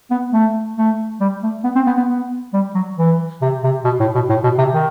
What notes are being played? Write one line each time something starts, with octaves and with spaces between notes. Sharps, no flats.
B3
A3
A3
G3
A3
B3
C4
B3
B3
B3
G3
F#3
E3
C3
C3
B2
A2
B2
A2
B2
C3
D#3